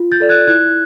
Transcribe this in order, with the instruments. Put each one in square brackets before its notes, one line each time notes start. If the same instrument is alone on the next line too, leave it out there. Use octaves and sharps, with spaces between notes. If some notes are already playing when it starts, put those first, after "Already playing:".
Already playing: [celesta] F4
G6 A6
A4 D5
F#6 G#6
E4 F#6 G#6